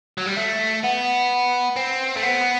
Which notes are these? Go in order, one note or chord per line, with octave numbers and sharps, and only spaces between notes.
F#3
G3
A3
B3
C4
A3
B3